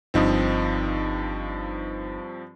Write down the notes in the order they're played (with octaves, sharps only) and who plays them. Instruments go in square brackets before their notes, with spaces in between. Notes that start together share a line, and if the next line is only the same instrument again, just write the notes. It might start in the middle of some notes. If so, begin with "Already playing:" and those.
[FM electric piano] G1 D#4 D#5 [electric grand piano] G2 F3 C4